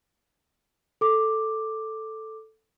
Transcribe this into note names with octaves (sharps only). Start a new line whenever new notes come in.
A4 D6